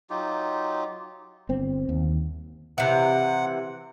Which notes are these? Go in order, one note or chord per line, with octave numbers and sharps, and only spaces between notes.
F#3 D#4 F4 G4
G1 C4
D#2
C3 E3 F#5